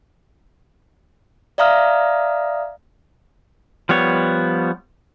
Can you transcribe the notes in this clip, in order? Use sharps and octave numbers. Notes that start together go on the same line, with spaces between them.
D5 E5 F5 A#5 D#6 F6
F3 G3 B3 C#5